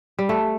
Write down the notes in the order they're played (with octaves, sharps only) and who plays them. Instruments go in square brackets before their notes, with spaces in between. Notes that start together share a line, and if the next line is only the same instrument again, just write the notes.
[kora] G3
A3